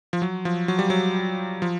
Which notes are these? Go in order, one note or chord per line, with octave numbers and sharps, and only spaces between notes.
F3
F#3
F3
F#3
G3
F#3
F3